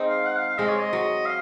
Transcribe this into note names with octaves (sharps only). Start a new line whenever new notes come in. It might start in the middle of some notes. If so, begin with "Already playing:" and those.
Already playing: G#3 C4 D#4
F5
F#5
F5
F5
G#3 C4 D#5
C#5
D#5
F#3
F5